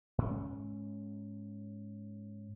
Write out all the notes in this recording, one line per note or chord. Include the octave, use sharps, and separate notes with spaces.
G#2 C#4